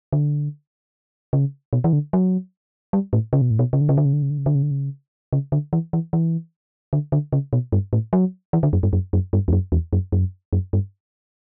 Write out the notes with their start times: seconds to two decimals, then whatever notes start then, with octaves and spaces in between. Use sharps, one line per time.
0.13 D3
1.33 C#3
1.73 B2
1.84 E3
1.93 D3
2.13 F#3
2.93 G3
3.13 A2
3.33 C#3
3.41 B2
3.51 A2
3.59 B2
3.73 C#3
3.81 D3
3.89 C#3
3.98 D3
4.05 C#3
4.13 D3
4.22 C#3
4.30 D3
4.38 C#3
4.46 D3
4.55 C#3
4.63 D3
4.71 C#3
5.33 C#3
5.52 D3
5.73 E3
5.93 E3
6.13 E3
6.93 D3
7.12 D3
7.33 C#3
7.53 B2
7.72 G2
7.93 A2
8.13 F#3
8.53 E3
8.63 D3
8.73 F#2
8.83 G2
8.93 F#2
9.13 F#2
9.33 G2
9.48 E2
9.53 F#2
9.72 E2
9.93 F#2
10.12 F#2
10.53 F#2
10.73 G2